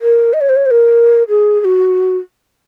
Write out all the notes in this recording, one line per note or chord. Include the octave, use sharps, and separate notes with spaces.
A#4
D#5
C#5
C5
C#5
C5
A#4
G#4
G#4
F#4